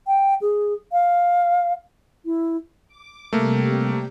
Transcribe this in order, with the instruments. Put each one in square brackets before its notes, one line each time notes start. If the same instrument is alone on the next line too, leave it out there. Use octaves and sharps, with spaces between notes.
[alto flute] G5
G#4
F5
E4
[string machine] D6
[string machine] C3 G3 G4 [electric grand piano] A3 A#3